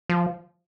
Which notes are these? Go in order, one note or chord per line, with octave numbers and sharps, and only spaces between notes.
F3